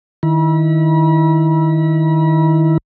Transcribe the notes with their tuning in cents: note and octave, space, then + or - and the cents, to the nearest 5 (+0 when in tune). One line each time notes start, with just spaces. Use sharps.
D#3 +0 E4 +0 B5 -40